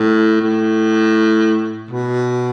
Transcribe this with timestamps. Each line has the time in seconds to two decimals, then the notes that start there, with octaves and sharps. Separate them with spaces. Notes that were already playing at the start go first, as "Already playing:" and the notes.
Already playing: A2
0.41 A2
1.91 B2